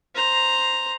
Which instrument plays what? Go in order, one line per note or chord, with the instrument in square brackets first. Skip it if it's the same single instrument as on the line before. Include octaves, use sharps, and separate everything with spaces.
[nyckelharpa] C5 A#5